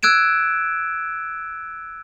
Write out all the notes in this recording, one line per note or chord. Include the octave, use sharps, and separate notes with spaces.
E6 F#6 G#6 D7 E7